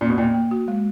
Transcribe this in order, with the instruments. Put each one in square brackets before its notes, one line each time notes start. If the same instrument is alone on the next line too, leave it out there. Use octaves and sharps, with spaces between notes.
[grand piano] A#2 [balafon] C#4
[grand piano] B2
[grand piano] A#2 [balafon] A#3
[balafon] A#3
F#4
G#3